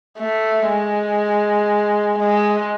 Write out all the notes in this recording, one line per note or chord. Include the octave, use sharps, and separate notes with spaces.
A3
G#3
G#3